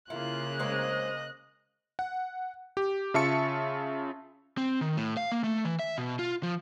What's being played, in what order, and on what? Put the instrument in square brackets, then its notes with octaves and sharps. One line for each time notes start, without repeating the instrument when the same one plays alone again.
[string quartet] C#3 A#3 [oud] E4 [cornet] F4 [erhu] F#6
[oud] G#3 C4 C#4 [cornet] D#5
[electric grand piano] F#5
G4
C#3 F4 E5 A5 C#6 C#7
[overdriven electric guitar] C4
D#3
A2
F5
A#3
A3
E3
E5
B2
F4
F3